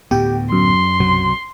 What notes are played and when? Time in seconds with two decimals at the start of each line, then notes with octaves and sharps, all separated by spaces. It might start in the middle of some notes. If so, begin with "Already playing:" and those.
0.11 D2 A2 B3 G4 G5
0.52 F#2 C6
1.00 B1 C3 F#3